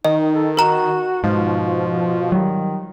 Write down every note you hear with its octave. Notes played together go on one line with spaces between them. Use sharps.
D#3 D#4 D#5
A4
F#4 A#4 A#5 E7
G#2 B2 F3
D#3 F#3 G3